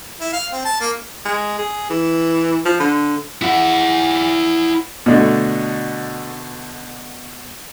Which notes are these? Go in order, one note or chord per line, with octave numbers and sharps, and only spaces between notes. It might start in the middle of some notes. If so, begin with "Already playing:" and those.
E4
F5
C4
A5
A#3
G#3
G#4
E3
F3
D3
E4 F#5
B2 D3 A3